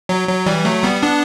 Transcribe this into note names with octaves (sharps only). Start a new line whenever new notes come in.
F#3
F#3
E3 G3
F#3 A3
G3 B3
B3 D4